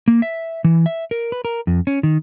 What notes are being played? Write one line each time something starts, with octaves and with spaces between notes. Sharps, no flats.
A#3
E5
E3
E5
A#4
B4
A#4
F2
C#4
D#3